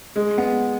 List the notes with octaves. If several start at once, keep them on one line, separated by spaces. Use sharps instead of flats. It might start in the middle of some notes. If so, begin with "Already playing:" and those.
G#3
B3